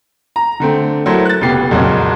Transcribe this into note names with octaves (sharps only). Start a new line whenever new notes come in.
A#5
D3 A3 C4
F#3 A3 E4 A#4 C5
F#6 A6
F1 C#3 B3 G4 C7
C2 F2 A#2 C#3 F#3 G#3